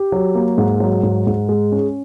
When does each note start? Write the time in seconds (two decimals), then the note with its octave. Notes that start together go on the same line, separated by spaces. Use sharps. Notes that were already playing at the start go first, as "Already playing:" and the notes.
Already playing: G4
0.12 F#3
0.35 A#3
0.58 G#2
0.80 F#3
1.03 G#2
1.27 G#2
1.49 G#3
1.72 C#4